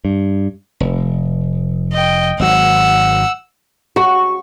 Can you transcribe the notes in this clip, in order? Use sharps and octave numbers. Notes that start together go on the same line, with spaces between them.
G2
F1
D#5 G5
G#1 F#3 F#5 E6
F#4 C#6